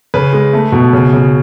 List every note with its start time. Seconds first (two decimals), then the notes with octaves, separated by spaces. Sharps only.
0.14 C#3 B4
0.33 G#3
0.53 A3
0.72 B2
0.93 C#3
1.13 C#3